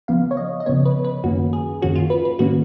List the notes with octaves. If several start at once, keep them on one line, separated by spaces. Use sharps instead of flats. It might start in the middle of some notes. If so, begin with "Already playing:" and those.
C#3 F3 B3 F5
C#5
D#5
D#5
C#3 F3 B3 C#5
B4
B4
F#2 D#3 A#3 C#4 F#4
G#4
F#2 D#3 A#3 C#4 F#4
F4
B4
B4
G#2 D#3 A#3 C#4 F#4